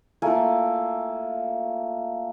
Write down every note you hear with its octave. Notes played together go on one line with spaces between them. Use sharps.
A3 A#3 F4 G#5